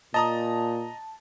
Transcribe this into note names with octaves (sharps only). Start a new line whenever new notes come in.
A#2 D#5 A5 A#5 D#6